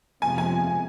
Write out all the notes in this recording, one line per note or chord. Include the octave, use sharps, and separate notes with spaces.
F2 C3 F3 G#3 G#5
G#5